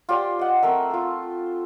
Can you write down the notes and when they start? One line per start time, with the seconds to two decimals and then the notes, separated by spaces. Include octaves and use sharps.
0.09 F4 G4 C5 D5
0.39 D#5 F#5
0.62 A3 C4 A#4 E5
0.90 F4 A4